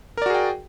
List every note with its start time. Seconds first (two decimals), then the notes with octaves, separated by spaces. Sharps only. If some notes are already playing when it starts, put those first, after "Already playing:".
0.17 A#4
0.22 D5
0.26 F#4
0.30 G#4
0.34 G5